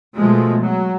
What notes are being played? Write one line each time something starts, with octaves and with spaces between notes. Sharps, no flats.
B2 F3 G#3 A3
F#3